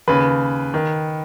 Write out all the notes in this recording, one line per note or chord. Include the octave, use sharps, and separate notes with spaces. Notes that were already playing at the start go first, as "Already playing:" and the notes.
D#2 C#3 B4
D#3